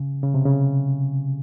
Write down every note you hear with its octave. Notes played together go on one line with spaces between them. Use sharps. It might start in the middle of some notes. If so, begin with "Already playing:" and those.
Already playing: C#3
C#3
C3
C#3